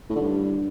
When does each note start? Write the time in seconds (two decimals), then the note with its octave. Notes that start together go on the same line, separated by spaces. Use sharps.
0.10 A2
0.15 D3
0.21 G2